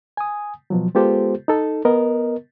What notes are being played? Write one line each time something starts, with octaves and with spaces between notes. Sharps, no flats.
G#5 D#6
B2 F3 F#3
G#3 B3 F4 G4 A4 C5
D#4 A4
B3 A#4 D#5